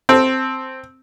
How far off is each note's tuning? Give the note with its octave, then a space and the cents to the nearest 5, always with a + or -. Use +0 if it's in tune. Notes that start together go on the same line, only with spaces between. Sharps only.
C4 +0 A4 +0